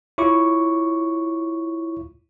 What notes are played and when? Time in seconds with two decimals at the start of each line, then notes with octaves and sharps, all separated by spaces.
0.18 E4 F4 C#5 C#6 D6